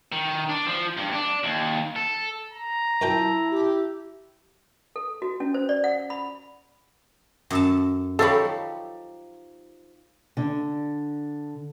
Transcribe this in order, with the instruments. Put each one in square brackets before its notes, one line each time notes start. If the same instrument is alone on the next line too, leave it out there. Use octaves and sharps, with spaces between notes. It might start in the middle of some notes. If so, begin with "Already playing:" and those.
[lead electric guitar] D#3
D4
F3
G2
D4
D#2
A4
[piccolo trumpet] A#5
[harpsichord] F#2 F4 G5 [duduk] E4 [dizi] A5
[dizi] G4
[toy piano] A4
F#4
C#4
C5
D5
F#5
B5
[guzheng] F#2 A4 A5
[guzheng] F3 D#4 G4 [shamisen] A4 C#5 B5
[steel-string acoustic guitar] D3